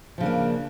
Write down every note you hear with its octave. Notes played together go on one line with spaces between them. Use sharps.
C#3 F3 A#3 D4